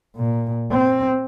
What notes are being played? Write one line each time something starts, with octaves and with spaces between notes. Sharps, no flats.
A#2
C4